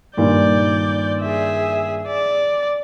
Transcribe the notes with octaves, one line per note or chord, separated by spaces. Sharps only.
G2 A#2 D#3 D5 G6
G#4 E5
D5